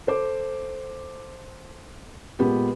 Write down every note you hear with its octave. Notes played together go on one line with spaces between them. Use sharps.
A4 C5 D6
A#2 G#3 B3 G4